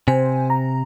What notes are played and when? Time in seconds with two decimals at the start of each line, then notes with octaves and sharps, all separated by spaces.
0.08 C3 C5 G#5
0.50 A#5